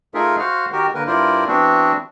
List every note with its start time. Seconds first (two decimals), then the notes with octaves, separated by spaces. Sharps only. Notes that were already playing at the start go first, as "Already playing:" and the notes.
0.14 A3 D#4 F4 G#4 A#4 E5
0.39 F#4 C5 F5 F#5 F6
0.72 D#3 F#4 G4 A#4
0.95 D3 A#3 A#4 B4
1.07 G2 E4 F4 A#4 C5 D5
1.47 E3 B3 C4 D4 F#4